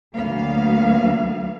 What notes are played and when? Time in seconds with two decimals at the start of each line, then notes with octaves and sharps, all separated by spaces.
0.17 D2 F#3 A#3 B3 F5